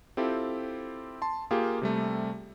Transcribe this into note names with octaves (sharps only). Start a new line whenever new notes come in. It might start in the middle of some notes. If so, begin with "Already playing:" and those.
C4 E4 F4 G4 A4
A5 C6
A#3 F4 G4 G#4
C3 G3 A3